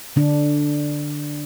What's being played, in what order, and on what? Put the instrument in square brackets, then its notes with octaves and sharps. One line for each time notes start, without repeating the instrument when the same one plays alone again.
[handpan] D3 D4